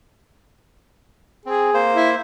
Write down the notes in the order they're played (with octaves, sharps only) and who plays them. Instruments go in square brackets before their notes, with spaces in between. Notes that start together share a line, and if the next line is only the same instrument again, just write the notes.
[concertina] C4 [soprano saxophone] G#4
[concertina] A#3 C5
[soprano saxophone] E4